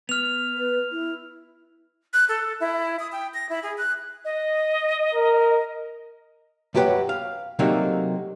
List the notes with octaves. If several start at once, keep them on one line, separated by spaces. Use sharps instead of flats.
B3 F6 F7
B4
E4
F#6
A4
E4
D#6
G5
A#6
E4
G#4
F#6
D#5
A#4
F#2 F#3 G4 B4 C#5 F#5
F5
C3 F#3 A3 A#3 D4 D#4